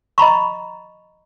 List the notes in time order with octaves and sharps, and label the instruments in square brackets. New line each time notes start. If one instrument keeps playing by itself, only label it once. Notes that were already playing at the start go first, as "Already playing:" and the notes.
[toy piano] D#5 A#5 B5 C#6